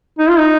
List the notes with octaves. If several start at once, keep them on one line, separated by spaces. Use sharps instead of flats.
D#4
F4
D#4